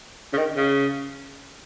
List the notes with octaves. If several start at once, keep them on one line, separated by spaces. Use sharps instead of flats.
C#3
D#3
C#3